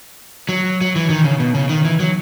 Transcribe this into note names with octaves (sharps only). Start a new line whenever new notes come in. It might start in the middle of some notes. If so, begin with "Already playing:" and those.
F#3
F#3
E3
D#3
C#3
B2
C#3
D#3
E3
F#3